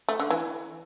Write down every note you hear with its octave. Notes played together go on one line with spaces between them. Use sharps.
A3
D3
E3